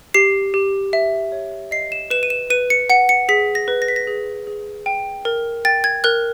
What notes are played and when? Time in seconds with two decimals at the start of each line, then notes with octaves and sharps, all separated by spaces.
0.14 G4 C7
0.54 G4
0.93 E5
1.32 C#5
1.71 D#5 C7
1.92 E7
2.10 B4 E7
2.23 D#7
2.30 E7
2.50 B4 D#7
2.70 C#7
2.90 F#5 C#7
3.09 C#7
3.29 G#4 B6
3.55 A#6
3.68 B4
3.82 A#6
3.88 B6
3.96 A#6
4.07 G#4
4.47 G#4
4.86 G5
5.25 A#4
5.65 G5 A6
5.84 G#6
6.04 A#4 F#6